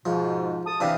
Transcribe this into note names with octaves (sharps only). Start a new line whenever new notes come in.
G#2 B2 F3
A5 D#6
C3 E3 D4 G4 F5